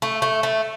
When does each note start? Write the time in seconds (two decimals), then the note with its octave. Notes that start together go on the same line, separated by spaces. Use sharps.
0.02 A3
0.22 A3
0.43 A3